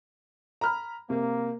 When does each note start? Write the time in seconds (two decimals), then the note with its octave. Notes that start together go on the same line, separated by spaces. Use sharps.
0.61 A#5 B5 F6
1.10 C3 A#3